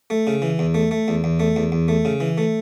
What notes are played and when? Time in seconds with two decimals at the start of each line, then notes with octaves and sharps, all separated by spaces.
0.10 A3
0.27 C#3
0.42 E3
0.59 E2
0.74 A3
0.91 A3
1.08 E2
1.24 E2
1.40 A3
1.56 E2
1.72 E2
1.88 A3
2.05 C#3
2.20 E3
2.38 A3